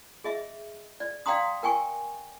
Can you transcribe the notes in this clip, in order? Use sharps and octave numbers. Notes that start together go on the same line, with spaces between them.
G#4 D#5 E5
D5
D5 F5 G5 A#5 C6 D#6
A#4 G5 G#5 C#6